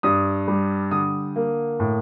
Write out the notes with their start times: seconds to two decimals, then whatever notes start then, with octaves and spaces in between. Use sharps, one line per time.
0.03 G2 D#6
0.48 G3
0.91 D3 D#6
1.36 A#3
1.80 A2